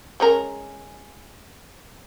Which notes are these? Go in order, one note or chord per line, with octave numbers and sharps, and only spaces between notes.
G#3 C#4 A#4